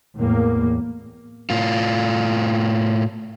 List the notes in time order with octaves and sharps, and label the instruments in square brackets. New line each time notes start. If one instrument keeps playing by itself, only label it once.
[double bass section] E2 A2 A#3
[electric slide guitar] A2 F4